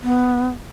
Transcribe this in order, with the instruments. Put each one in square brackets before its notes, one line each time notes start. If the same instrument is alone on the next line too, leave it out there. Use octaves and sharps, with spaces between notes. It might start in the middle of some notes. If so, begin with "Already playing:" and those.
[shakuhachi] B3